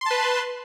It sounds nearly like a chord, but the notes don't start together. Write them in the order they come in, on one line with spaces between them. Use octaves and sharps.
C6 A5 B4